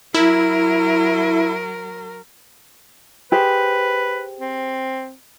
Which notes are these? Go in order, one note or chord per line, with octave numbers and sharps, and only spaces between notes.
F#3 E4 A#4
G4 G#4 B4 C5
C4